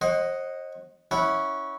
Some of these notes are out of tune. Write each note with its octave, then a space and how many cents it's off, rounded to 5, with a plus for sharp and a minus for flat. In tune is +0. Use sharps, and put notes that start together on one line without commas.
C5 +40 D#5 +0 F#5 +0
C#4 +0 E4 -15 F#5 +0